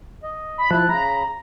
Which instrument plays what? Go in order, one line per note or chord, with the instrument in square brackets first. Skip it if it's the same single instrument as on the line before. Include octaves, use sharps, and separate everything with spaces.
[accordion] D#5
[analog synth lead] B5
[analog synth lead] F3 [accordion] E4 A5 F#6
[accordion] C#3 B5 [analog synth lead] A#5